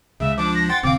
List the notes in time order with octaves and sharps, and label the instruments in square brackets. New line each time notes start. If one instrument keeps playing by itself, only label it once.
[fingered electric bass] C#2 G#3 [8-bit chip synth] C#3 [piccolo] E5
[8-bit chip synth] F3 D4 [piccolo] D6
[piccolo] A#6
[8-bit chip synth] F#5 G5 C6 [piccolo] A6
[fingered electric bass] E1 B2 D3 [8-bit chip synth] C4 F5 [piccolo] D6